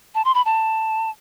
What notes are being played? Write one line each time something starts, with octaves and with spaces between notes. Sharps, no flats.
A5
C6
B5
A5